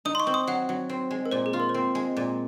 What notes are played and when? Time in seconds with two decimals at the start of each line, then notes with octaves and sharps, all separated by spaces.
0.05 D#4 D#6
0.15 C6
0.20 C#6
0.27 C4
0.34 D#6
0.47 F#3 F#5
0.69 F#3
0.89 C4
1.10 G#3
1.26 A#4
1.31 A#2 C5
1.46 G#4
1.53 F4
1.60 A#4
1.69 C5
1.74 C4 A#4
1.95 G#3
2.16 A#2